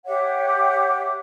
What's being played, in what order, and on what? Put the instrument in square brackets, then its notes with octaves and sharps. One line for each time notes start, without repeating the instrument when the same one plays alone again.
[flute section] G4 C#5 E5 F#5